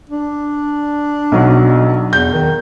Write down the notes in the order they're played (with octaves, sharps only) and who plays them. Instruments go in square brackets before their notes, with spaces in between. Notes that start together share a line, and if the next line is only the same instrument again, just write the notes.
[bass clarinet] D4
[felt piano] B1 F#3
[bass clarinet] E2 [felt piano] G6
[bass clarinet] D#3